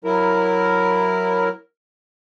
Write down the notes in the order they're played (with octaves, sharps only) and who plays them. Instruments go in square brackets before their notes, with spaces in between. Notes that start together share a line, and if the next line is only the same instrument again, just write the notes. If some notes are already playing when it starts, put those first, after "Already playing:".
[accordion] F#3 E4 A#4